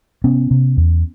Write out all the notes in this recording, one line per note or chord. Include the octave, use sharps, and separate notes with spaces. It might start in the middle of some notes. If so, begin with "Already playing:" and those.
C3 B3 C#4
C3
E2